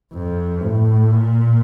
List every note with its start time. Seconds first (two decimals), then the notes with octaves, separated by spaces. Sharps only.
0.13 F2
0.62 A2
1.12 A#2